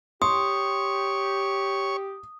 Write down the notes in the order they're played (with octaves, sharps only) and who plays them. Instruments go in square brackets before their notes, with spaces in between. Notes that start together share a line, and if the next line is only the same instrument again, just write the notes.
[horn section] G4 [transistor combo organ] C#5 C#6 [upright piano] C6 [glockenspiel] D#6